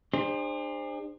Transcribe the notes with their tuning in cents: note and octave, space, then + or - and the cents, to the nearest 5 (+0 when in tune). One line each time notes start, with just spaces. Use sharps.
D4 +35 G#4 -40 C5 +10